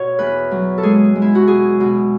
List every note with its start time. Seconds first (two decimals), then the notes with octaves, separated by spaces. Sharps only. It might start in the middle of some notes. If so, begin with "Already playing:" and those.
Already playing: B2 C#5
0.19 E2 B4
0.51 F#3
0.78 A4
0.83 G#3 G#4
1.15 G#3
1.22 E4
1.35 F#4
1.47 B2 G#4
1.80 B2